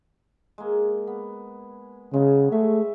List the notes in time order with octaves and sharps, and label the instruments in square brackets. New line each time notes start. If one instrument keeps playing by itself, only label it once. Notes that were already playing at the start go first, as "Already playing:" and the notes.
[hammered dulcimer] G#3 A#3
B3
[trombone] C#3 [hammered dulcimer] F#3 G#3
[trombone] A3 [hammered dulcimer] G#4 E5 C#6